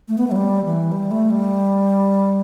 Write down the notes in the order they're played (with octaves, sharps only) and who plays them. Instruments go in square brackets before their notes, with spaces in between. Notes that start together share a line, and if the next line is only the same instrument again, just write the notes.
[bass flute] A3
B3
A3
F#3
G3
E3
G3
A3
G3